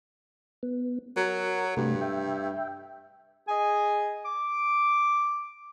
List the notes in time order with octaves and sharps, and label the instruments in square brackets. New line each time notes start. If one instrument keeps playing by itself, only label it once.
[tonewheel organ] B3
[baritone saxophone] F#3 [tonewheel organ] A#4
[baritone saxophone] G2 [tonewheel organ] C3 A3
[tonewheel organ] E5 G5
[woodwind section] G#4 D#5 G#5
D6